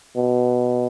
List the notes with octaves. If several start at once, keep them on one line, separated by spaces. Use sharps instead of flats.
B2